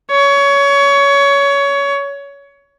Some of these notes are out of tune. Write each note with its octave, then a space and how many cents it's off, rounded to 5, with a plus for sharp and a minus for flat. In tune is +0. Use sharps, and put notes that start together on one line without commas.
C#5 +20